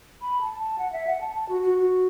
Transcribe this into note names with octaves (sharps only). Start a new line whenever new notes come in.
B5
A5
A5
F#5
E5
F#5
A5
A5
F#4
F#4
F#4